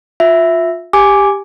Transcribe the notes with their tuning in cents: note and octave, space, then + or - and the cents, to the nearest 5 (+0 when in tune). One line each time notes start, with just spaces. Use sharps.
F4 +25 E5 +0
G4 +10 G#5 +0 D6 +0